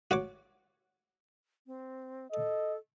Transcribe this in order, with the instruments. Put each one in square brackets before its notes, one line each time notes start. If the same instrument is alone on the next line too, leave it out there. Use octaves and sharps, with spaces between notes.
[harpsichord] F#4 C#5 D6
[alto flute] C4
[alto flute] A4 [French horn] D#5